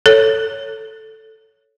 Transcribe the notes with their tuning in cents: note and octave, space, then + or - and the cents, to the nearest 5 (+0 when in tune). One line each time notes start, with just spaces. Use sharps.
A4 +0 C#5 +0